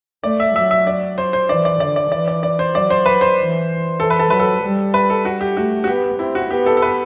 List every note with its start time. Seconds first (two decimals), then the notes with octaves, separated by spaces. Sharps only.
0.24 A3 D5
0.40 E5
0.55 F#3 E5
0.71 E5
0.87 D5
1.18 C5
1.33 C5
1.49 E3 D5
1.65 D5
1.80 D3 D5
1.96 D5
2.12 E3 D5
2.28 D5
2.43 D5
2.59 C5
2.74 F#3 D5
2.90 C5
3.06 B4
3.21 C5
3.38 E3
4.00 E3 A4
4.10 B4
4.19 A4
4.30 F#3 B4
4.39 A4
4.62 G3
4.94 B4
5.10 A4
5.25 F#4
5.41 G4
5.56 A3 F#4
5.84 F#4
5.88 B3 G4
6.19 C4 E4
6.35 F#4
6.50 B3 G4
6.66 A4
6.77 A4
6.82 B4